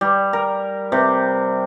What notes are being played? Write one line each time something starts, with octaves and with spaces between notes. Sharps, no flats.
G3
A#4
C3